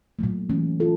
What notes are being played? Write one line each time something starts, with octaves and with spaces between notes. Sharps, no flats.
A#2 F#3 A3
E3 A3 C#4
F4 A4